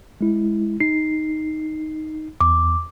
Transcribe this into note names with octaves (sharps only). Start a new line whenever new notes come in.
G#3 E4
D#4 C7
E2 D6